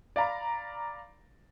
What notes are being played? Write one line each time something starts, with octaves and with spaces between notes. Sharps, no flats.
D5 F5 A#5 B5